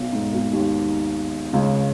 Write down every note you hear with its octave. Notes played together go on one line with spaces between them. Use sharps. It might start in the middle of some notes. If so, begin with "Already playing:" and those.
Already playing: B1 B2
G#2
B1 B2
D#2 D#3
C#2 C#3